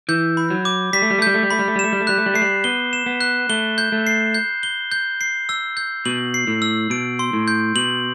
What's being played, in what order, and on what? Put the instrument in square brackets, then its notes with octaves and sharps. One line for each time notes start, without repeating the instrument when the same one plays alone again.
[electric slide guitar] E3 [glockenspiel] G6
[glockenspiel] B5
[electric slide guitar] F#3
[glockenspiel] D6
[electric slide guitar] G3 [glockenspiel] B6
[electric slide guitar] A3
G3
A3
[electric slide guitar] G3 [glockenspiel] G6
[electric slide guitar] A3
G3
[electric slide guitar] A3 [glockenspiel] B5
[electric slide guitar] G3
A3
G3
[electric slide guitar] A3 [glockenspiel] E7
[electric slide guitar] G3
A3
[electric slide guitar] G3 [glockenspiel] F#6
[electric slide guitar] A3
G3
[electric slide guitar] A3 [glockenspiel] C7
[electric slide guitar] G3
[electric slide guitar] B3 [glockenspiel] G7
[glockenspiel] E7
[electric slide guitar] B3
[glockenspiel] F#6
[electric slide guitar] A3 [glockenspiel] G7
[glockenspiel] G6
[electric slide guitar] A3
[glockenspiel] C7
G6
G7
G6
C7
E6
G6
[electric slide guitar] B2 [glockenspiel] F#7
[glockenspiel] C7
[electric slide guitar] A2
[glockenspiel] E6
[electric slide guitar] B2 [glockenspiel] D7
[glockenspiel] C6
[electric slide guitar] A2
[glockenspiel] G6
[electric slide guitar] B2 [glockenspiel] F#7